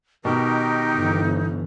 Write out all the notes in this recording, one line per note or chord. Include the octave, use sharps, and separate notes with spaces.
B2 D#3 D#4 G4 A#4
G1 E3